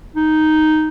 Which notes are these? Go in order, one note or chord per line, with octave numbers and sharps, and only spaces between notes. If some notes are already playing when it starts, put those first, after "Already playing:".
D#4